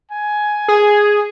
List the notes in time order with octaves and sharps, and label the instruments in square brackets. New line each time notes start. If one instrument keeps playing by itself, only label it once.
[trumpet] G#5
[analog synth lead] G#4